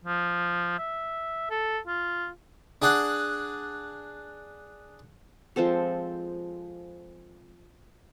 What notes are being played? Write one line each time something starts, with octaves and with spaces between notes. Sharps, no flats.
F3
E5
A4
F4
D4 G#4 F#5
F3 G#3 C4 A4